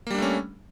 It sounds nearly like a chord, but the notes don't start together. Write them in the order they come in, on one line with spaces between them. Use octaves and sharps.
A#3 G3 D4 A3 C#4